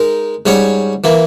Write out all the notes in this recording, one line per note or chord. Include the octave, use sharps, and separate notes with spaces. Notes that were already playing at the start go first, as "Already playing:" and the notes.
Already playing: G#3 D#4 A#4
G#2 G3 C#4 G#4 C#5
E3 A#3 E4